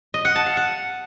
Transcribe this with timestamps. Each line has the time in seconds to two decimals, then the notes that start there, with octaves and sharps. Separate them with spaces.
0.14 D#5
0.25 F#5
0.35 A5
0.46 F5
0.57 F#5